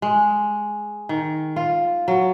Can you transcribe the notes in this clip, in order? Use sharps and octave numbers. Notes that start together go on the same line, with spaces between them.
G#3
D#3
F4
F#3